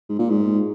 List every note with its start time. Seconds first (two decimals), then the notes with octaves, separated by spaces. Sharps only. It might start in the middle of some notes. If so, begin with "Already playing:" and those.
0.09 G#2
0.19 A#2
0.30 G#2